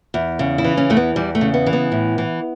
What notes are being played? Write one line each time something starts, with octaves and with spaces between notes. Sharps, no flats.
E2
C#3
E4
E3
C#4
E2 A3
B3
E2 G3
A3
C#3
B3
E3
B3
A2
E3